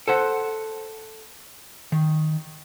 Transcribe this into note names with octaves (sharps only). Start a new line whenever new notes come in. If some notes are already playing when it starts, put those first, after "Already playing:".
A4 C5 F#5
D#3